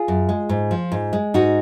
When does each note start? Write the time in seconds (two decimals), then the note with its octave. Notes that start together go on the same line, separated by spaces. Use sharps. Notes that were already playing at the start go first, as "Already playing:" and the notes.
Already playing: F4 G#4
0.08 F#2
0.29 G#3
0.49 G#2
0.71 F3
0.92 G#2
1.13 G#3
1.34 G#2 D#4 F#4